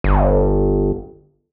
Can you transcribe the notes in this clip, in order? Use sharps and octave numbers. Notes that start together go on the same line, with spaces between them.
G1